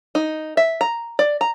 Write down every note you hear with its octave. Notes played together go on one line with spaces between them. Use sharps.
D#4
E5
A#5
D5
A#5